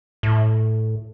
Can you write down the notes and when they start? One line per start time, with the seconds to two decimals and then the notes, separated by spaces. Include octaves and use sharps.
0.23 A2